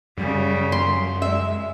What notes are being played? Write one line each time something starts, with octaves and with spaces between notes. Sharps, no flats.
F#2 C#3 G3
C6
G#3 E5